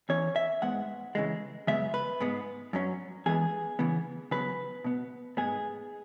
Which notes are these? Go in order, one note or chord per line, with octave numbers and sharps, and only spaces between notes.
E2 E3 C#4 C#5
E5
G#2 G#3 B3 F#5
C#3 E3 G#3
F#2 C#3 G#3 B3 E5
B4
G#2 G#3 B3
F#2 F#3 C#4
E2 E3 G#3 B3 G#4
C#3 E3 B3
C#3 F#3 B3 B4
B2 B3
G#2 G#3 B3 G#4